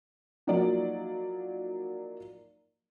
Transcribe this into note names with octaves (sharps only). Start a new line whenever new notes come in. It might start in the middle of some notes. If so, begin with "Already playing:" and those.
F3 F#3 A#3 D#4 D5